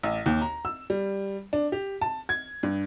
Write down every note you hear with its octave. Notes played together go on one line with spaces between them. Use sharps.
A1
D#2
A#5
E6
G3
D4
G4
A5
G#6
G2